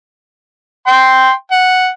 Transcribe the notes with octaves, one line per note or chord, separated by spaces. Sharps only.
G5 C6
F#5